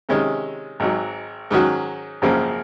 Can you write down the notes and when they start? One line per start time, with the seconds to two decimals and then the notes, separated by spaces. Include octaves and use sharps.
0.09 C3 D#3 G#3 C#4
0.80 G#1 G#2 F#3
1.51 G#2 D#3 F#3 C#4 F#4
2.22 G#1 F#2 C#3 F3 A#3